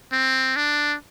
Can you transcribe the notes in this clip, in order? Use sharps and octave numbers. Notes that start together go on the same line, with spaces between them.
C4
D4